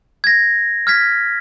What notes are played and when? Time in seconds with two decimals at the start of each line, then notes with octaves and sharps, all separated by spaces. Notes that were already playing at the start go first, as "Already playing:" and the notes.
0.24 G#6 A#6
0.87 F6 G#6 B6